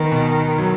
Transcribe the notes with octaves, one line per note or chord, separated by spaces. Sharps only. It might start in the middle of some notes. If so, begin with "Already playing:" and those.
Already playing: D#3 B3
B2
F#3